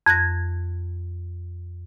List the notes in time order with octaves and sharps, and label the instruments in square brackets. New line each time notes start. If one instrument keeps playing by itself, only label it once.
[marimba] F2 F#6 G#6 A#6